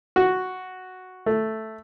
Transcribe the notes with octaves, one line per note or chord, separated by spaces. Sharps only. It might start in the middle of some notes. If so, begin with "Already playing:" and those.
F#4
A3